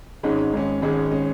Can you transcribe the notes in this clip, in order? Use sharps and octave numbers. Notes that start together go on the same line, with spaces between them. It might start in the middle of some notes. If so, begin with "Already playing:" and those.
G#1 G#2 G#3 C#4
G#1 G#2 G#3 C#4
G#1 G#2 G#3 C#4
G#3 C#4